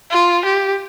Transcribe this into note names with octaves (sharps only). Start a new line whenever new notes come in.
F4
G4